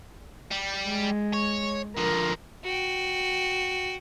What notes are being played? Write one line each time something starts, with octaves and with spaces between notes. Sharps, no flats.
G3
G#3
C#5
D3 F3 A#4
F#4 G5